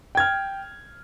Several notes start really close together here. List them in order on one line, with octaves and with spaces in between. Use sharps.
G5 G#6 F6